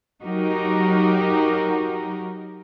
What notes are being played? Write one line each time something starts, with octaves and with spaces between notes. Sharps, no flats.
F#3 D#4 F#4 G4 A#4